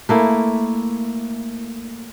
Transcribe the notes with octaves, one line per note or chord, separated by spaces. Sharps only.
A3 A#3 E4